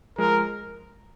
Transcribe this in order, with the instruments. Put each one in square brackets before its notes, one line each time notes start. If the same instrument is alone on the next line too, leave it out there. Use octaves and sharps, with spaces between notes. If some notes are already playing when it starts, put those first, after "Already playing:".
[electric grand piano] F3 G#3 [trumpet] A#4